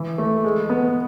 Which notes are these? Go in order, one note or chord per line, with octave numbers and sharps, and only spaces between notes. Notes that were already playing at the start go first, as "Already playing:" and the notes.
Already playing: E3
A3
G#3
B3